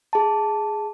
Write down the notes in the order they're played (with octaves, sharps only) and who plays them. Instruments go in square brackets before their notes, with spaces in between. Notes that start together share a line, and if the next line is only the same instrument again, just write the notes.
[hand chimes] G#4 A5